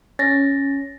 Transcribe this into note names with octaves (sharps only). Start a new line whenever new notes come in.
C#4 A6 A#6